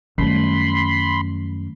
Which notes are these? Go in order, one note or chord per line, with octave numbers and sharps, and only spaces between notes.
F#2 D#3 G3 A3 B5 C6